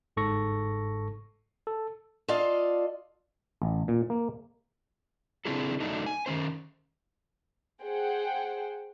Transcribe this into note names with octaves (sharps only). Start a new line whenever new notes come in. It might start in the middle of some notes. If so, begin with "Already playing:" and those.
G1 G#2 A4 C#6 A#6
A4
F4 A4 D5 D#5 F5
A1
A#2
A#3
C#3 C4 D4 E4 G#4 A4
D3 F#3 A3 D4 D#4
G#5
D#3 G#3 C#4 C5
G#4 C5 F#5 G5